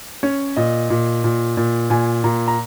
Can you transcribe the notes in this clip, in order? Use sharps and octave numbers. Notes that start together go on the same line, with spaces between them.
C#4 C#5
A#2 D#5
A#2
A#2
A#2
A#2 G#5
A#2 A#5
A#5